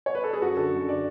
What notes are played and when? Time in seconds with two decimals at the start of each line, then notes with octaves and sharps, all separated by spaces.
0.06 C#5
0.15 B4
0.24 A4
0.33 G#4
0.41 F#2 F#4
0.57 D3 A4
0.73 F#2
0.88 D3 D5